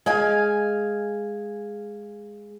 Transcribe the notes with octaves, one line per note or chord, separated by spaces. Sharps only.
G#3 F5 G#5